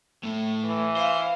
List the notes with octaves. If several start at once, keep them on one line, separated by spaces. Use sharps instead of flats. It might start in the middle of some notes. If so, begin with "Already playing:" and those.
A2 A3
E3
C5 F5